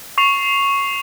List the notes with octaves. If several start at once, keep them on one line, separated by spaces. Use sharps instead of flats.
C#6 C7 F7